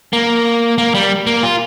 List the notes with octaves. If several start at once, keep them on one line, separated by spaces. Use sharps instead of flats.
A#3
A#3
G3
A#3
F4